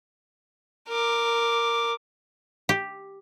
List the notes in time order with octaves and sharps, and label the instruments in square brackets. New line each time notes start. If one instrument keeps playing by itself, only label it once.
[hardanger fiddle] A#4 D6
[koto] G4